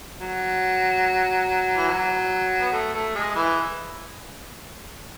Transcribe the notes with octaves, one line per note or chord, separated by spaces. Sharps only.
F#3
E3
F#3
B3
A3
A3
G#3
E3